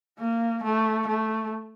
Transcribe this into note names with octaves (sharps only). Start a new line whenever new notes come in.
A#3
A3
A3